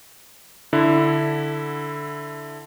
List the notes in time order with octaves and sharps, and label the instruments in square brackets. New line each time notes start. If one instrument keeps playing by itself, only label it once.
[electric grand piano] D3 E4